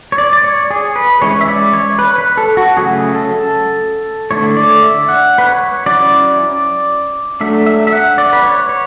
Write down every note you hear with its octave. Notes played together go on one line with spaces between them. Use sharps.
C#5
D5
D5
C#5
G#4
B4
E3 G#3 C#4 E4 C#5
E5
D5
C#5
B4
B4
A4
F#4
C#3 F#3 A3 C#4 G#4
A4
D3 A3 E4 C#5
D5
E5
F#5
B4
C#5
F#3 C#4 E4 D5
F#3 A3 D4 E5
E5
E5
F#5
D5
B4
C#5
C#5